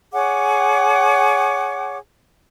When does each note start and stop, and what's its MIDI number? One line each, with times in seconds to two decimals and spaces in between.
0.12 1.97 68
0.12 1.97 73
0.12 1.97 78
0.12 1.97 86